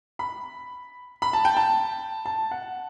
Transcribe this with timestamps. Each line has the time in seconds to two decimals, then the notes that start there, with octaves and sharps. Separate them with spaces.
0.19 B5
1.22 B5
1.33 A5
1.45 G5
1.57 A5
2.26 A5
2.51 F#5